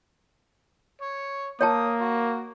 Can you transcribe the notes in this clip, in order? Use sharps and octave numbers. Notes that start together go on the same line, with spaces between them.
C#5
A#3 C#5 G5 A5 D#6
F#4